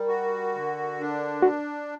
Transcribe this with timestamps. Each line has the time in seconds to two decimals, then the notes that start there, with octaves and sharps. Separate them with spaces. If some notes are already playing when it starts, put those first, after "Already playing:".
Already playing: G3 A#4
0.08 F#4
0.55 D3
1.01 D4
1.42 F#4